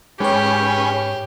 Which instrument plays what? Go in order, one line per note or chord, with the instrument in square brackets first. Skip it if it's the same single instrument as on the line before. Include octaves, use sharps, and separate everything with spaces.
[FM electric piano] G#2 C#5 [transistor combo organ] C#4 G#4 B4 [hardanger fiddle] G4